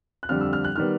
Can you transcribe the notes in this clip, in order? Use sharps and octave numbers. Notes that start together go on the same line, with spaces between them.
F#6
F2 D3 G3 F6
E6
F6
F#6
D#3 G3 B3 F6